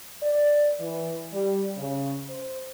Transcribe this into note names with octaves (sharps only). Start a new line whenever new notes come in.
D5
E3
G3
C#3
C5